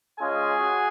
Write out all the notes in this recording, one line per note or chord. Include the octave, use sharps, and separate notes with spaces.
G#3 C#4 F4 G#4 G#5
F#4